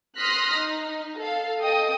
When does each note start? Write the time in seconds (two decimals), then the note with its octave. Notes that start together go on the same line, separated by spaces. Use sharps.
0.19 C6 D#6 F6 F#6 A#6 B6
0.55 D#4
1.18 A4 F5
1.60 A4 D#5 G5 D#6